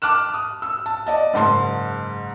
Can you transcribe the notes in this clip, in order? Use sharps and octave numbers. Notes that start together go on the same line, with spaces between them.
A5 D6 F6 F#6 E7
D#6
E6
A5
D5 D#5 A5
F#1 G#2 A5 C6